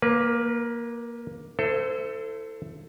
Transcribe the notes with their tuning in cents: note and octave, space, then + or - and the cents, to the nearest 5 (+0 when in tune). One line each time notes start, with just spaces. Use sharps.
A#3 +10 B4 -20
E4 +0 A4 +20 C5 -25